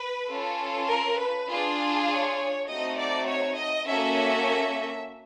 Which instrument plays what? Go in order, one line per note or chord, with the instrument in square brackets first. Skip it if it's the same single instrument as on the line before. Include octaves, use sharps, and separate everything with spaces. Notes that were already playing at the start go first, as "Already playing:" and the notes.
Already playing: [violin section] B4
C#4 F4 A4
A#4
B4
D4 F4 G#4
C#5
A3 C4 D#4 F#4 D#5
D5
C#5
D#5
A#3 C#4 F#4 A4 E5